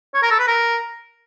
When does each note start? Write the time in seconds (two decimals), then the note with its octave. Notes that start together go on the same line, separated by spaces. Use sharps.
0.14 C#5
0.22 A#4
0.31 A4
0.39 B4
0.47 A#4